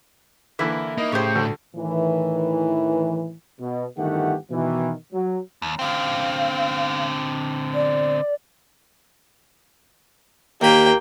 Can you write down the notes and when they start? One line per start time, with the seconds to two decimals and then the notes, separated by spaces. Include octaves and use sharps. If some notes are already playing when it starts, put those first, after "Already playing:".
0.59 D3 E3 A#3 E4
0.98 A#3 D#4
1.12 A2 C#3 G4 C5 C#5
1.35 D2 D3
1.76 A2 D#3 E3
3.59 B2
3.97 G1 D#3 E3 A3 G4 F#5
4.50 B2 D#3 E3
5.13 F#3
5.62 D#2
5.79 D3 C4 F5
7.74 D5
10.61 D#2 A#3 G5 B5